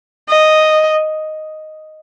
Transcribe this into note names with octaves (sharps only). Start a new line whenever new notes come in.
D#5